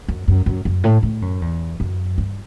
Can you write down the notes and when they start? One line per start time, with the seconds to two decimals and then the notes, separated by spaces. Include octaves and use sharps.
0.08 F#2
0.28 F#2
0.46 F#2
0.65 F#2
0.84 A2
1.03 A2
1.22 F#2
1.42 E2
1.80 F#2
2.18 G2